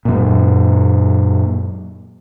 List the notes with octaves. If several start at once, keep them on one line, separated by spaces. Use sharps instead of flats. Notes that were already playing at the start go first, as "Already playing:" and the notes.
F#2 A#2